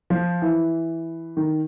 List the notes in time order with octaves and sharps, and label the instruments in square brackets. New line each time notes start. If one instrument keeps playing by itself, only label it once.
[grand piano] F3
E3
D#3